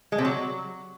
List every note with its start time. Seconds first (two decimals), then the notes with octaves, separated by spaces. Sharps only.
0.12 G#3
0.18 C3
0.25 F#3